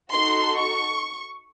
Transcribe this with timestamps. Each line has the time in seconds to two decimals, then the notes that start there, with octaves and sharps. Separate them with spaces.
0.12 D#4 F#4 A4 C6
0.56 C#6